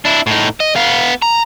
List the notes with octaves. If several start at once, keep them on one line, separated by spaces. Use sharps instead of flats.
D4 E4
A2 D#4
D#5
B3 F5
A#5